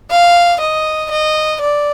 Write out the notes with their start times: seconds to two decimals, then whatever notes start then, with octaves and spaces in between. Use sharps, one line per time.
0.11 F5
0.61 D#5
1.11 D#5
1.61 D5